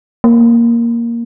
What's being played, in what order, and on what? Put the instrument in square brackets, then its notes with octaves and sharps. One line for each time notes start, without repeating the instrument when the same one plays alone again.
[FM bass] A#3